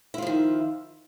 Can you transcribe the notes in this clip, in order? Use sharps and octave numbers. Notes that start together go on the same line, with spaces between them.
D#3 F3 E4 F4